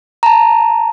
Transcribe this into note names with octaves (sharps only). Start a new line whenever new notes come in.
A5 A#5